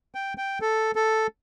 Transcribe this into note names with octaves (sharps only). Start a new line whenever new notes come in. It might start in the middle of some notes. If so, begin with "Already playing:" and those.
G5
G5
A4
A4